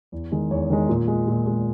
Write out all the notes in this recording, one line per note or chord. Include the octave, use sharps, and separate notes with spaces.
E2
D#3 G#3
E2 C#5
D#3 G#3
A#2
G#3
A#2
G#3